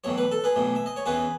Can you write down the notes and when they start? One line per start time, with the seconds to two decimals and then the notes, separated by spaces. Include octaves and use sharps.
0.04 B1 A2 E3 C#5
0.18 B4
0.31 A4
0.44 G#4 B4
0.56 B1 A2 E3
0.75 E5
0.86 D#5
0.96 C#5
1.06 E2 C#3 E3 G#4 B4